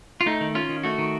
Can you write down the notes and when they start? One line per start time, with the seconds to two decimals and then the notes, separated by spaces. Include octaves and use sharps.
0.21 F4
0.26 A3 D#4
0.41 D#3
0.55 C#4 F4
0.69 D#3
0.84 A3 F#4
0.98 D#3